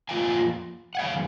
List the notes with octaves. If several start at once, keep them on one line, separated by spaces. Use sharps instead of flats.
F2 F3 A#3 F4 F5 G#5
F#5
F#2 D#3 F5 G#5